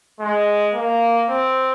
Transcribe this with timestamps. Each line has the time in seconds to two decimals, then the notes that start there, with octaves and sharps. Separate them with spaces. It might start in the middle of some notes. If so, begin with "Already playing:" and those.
0.20 G#3
0.74 A#3
1.29 C4